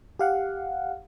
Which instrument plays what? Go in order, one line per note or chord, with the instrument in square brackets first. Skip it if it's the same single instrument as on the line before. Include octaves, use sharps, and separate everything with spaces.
[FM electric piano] G4 F5 F#5